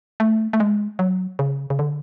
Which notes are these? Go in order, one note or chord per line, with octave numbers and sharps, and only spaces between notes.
A3
A3
G#3
F#3
C#3
C#3
D3